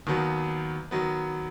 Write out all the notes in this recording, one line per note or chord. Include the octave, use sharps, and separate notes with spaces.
D#2 D#3 F#3 B3
D#3 F#3 B3